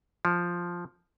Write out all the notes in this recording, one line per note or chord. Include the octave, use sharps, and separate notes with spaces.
F3